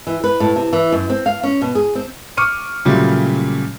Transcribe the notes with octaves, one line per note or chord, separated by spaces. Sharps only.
E3
B4
A2
C3
E3
F#2
C4
F5
C#4
B2
G#4
C4
C#6 D6 F6 C#7 D#7
A#2 C#3 F#3 G3 A3